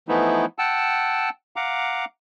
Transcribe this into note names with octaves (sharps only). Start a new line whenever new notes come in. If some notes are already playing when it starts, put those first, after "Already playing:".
E3 F3 A3 B3 D#4 E4
F#5 G5 A5 E6
F5 F#5 A#5 D6